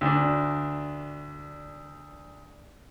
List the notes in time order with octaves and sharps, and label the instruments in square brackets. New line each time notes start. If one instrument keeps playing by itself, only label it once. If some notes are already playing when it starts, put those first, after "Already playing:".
[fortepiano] D2 D4